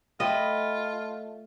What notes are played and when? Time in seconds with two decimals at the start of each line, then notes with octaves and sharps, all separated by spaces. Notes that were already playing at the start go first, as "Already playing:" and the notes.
0.20 A3 F4 D#5 E5 G5 B5